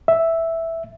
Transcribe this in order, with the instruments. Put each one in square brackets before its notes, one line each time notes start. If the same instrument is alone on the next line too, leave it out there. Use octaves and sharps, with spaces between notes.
[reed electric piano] E5